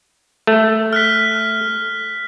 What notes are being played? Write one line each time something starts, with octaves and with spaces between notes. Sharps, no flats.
A3
F6 F#6 B6